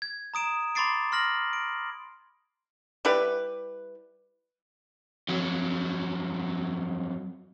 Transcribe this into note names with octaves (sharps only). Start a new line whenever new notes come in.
G#6
A#5 D#6 D7 E7
B5 C6 D6 A6 C7 D7
C6 F6 A#6 F#7
D7
G3 E4 G4 B4
F2 F#3